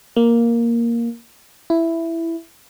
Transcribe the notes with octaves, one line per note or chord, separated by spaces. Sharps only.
A#3
E4